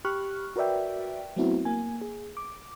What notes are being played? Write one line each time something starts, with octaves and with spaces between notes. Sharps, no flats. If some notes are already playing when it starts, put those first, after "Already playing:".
G4 B5 C#6 F6 F#6
F#4 A#4 B4 D5 E5 G5
F#3 A3 B3 C4 E4 F#4
A#3 G#5
G#4
D6